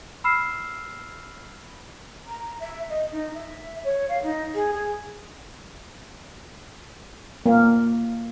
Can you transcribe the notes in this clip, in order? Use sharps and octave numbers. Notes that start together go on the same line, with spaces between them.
B5 E6 F6 C7 E7
A#5
E5
D#5
D#4
E5
C#5
F5
D#4
G#4
G#4
A#3